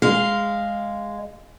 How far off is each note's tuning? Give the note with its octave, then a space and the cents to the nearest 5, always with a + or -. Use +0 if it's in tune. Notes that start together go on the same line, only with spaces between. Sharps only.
G#3 -5 F5 +0